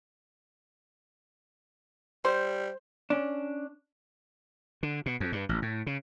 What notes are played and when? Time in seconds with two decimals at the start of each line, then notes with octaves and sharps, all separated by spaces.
2.25 G3 C5
3.10 C#4 D4
4.83 D3
5.06 B2
5.20 F2
5.32 G2
5.49 A1
5.62 A2
5.87 C#3